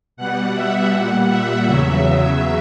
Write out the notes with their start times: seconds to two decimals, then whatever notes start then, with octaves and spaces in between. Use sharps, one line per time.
0.17 B2 G3 F#5
0.54 E5
0.92 A#2 G3 F#5
1.29 E5
1.66 E2 C#3 F#3 E5